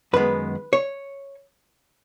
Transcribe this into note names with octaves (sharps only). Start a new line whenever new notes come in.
F#2 D#3 G#3 B3 B4
C#5